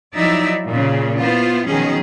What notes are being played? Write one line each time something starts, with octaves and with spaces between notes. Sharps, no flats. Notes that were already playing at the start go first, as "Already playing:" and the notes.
F3 F#3 D#4 E4 D5 E5
A#2 C#3
B3 E4 F4 C5
B2 D#3 F3 F#3 C#4 G#4